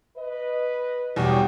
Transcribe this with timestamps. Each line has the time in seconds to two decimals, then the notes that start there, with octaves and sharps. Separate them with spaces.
0.16 B4 D#5
1.16 E2 B2 F#3 G3 G4